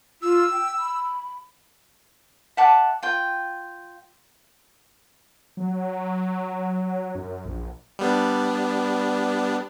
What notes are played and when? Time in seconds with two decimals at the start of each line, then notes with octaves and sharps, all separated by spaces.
0.22 F4 E6
0.52 G5
0.78 B5
2.57 E5 F#5 A5 D6
3.03 F4 G5
5.57 F#3
7.15 F#2
7.45 A#1
7.99 G3 B3 D4